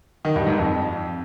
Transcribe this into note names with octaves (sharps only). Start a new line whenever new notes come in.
D#3
G2
G#2
F2